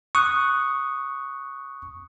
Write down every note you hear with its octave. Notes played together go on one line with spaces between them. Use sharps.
C#6 D#6 F#6